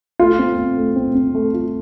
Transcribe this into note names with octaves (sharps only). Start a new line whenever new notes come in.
A3 F4
C4
C4
A3
C4
C4
A3
F4